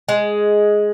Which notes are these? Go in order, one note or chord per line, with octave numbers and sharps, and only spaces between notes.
G#3